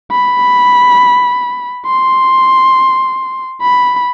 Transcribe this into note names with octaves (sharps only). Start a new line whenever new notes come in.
B5
C6
B5